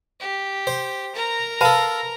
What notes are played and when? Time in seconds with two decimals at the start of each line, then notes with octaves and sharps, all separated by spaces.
0.21 G4
0.67 C5
1.15 A#4 A#5
1.61 A4 B4 F5 A5 B5